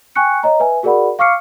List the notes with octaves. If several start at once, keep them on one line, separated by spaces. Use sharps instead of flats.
G5 G#5 C#6 F#6 C#7
C#5 D#5 A#5
B4 E5 G#5
F#4 G#4 A#4 D5 F#5 B5
F5 C#6 D6 F6 C7 C#7